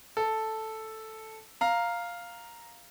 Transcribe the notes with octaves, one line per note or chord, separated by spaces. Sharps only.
A4
F5 A#5